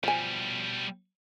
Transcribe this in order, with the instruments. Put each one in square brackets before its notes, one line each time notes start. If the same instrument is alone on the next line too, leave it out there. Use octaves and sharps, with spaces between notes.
[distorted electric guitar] B2 G3 [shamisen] F3 G#5